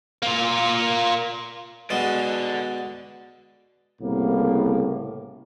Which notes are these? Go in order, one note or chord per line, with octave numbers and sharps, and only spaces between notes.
A#3 F4
B2 G#3 D5 F#5
C2 A2 C#3 A#3 B3